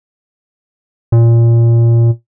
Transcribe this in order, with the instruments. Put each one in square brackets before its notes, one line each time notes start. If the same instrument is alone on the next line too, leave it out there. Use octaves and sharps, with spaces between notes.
[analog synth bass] A#2